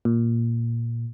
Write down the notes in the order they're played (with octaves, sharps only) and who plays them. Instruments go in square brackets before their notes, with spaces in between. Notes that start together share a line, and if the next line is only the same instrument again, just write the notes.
[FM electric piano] A#2